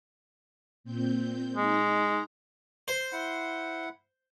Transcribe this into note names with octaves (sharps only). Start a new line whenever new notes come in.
A#2 C4 G6
G#3 D#4 A#5
C5
E4 F#5